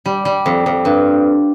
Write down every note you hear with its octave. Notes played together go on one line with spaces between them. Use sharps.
G3
G3
F2
F2
G2